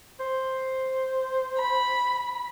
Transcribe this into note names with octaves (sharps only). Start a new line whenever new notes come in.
C5
B5